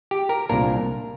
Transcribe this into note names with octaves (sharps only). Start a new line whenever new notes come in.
G4
A#4
C2 A#2 A#3 D4 A#4